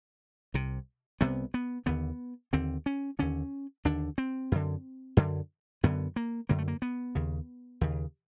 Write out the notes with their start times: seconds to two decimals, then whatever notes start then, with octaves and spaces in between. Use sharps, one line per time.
0.54 C2 C3
1.21 C2 C3 B3
1.54 B3
1.86 D#2 D3 B3
2.53 D#2 D3 C4
2.86 C#4
3.19 D#2 D3 C#4
3.85 D#2 D3 D4
4.18 C4
4.52 F#2 D3
5.17 F#2 D3
5.83 F#2 D3 B3
6.16 A#3
6.49 F#2 D3 A#3
6.58 A3
6.68 A#3
6.82 B3
7.15 D#2 C#3
7.81 D#2 C#3